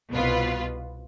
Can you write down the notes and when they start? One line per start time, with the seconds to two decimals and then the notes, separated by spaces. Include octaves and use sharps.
0.11 C2 B2 B3 F4 B4